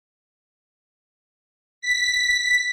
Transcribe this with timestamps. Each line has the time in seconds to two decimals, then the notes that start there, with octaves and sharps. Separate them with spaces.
1.81 B6